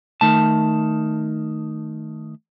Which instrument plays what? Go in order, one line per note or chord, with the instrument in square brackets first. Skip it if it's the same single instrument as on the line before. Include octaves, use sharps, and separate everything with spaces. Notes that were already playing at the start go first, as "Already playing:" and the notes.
[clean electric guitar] D#3 A3 A5